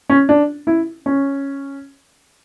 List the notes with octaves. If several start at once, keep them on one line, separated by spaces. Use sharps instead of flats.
C#4
D4
E4
C#4